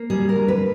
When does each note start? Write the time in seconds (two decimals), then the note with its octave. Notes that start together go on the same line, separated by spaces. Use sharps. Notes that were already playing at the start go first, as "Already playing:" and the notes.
Already playing: A#3
0.10 G3 G#4
0.29 A#4
0.35 D3
0.48 B4